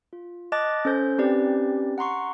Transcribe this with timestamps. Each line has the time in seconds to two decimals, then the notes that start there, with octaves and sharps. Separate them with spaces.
0.13 F4
0.52 D#5 A5 D6 F#6 A6
0.85 C#4 A4 C5 G6
1.18 C4 C#4 D#4 G4 B4 D5
1.98 F#5 A#5 C6 C#6